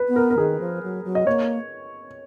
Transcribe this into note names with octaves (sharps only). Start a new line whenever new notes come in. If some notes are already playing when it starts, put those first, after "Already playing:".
Already playing: B4
B3
A#4
A#4
D#3 G#4
F3
F#3
F#3
D#5
A#3 C#5